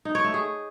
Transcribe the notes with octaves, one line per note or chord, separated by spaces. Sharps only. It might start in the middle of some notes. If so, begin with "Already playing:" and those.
D#4
C#5
A3
G#4